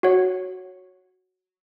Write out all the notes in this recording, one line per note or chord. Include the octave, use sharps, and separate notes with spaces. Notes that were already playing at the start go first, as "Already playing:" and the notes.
F#4 C#5 F#5